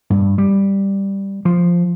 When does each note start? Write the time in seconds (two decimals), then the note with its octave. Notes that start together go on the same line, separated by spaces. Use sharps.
0.10 G2
0.38 G3
1.45 F3